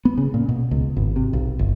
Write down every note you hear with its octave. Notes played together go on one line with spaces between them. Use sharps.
B3
C#3
A#2
B2
C#2
G#1
C3
B1
G1